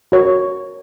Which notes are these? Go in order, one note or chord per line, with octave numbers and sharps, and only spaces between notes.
F#4 A#4 C#5